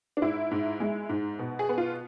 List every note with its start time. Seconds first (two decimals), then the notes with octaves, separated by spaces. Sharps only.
0.17 D4
0.22 G#2 E4
0.51 G#2
0.80 G#3
1.09 G#2
1.39 B2
1.59 G#4
1.69 B3
1.78 F4